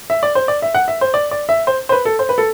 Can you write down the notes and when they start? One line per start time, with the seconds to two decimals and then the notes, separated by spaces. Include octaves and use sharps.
0.10 E5
0.23 D5
0.35 C5
0.48 D5
0.62 E5
0.75 F#5
0.88 E5
1.01 C5
1.14 D5
1.31 D5
1.49 E5
1.67 C5
1.89 C5
1.92 B4
2.05 A4
2.19 C5
2.29 B4
2.38 A4